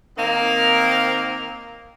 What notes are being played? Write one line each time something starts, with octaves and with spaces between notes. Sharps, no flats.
D#3 A#3 C4